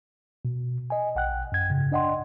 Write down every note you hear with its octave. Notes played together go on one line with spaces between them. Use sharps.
B2
D#5 G#5
A#1 F#5 G5 F#6
F#2 G#6
G#2 C#3
D4 D5 D#5 F#5 G5 C6